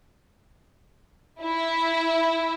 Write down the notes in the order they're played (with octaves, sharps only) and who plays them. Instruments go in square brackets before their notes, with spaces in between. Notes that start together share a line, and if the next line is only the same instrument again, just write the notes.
[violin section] E4